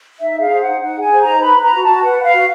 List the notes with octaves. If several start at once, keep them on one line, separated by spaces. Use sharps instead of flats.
D#4 E5
G#4
F5
C5
D#4 F#5
D#4 F#5
G#4 G#5
C5
D#4 A#5
B4 B5
B4 A#5
F#4
F#4 A5
B4 F#5
B4
F5
F#4